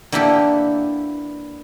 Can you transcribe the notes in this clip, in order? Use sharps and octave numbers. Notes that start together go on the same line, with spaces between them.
D3 A#3 B3 E4 G4 A4